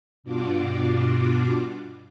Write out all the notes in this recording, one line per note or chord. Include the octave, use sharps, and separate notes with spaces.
G2 B2 D4 F4 F#4 D6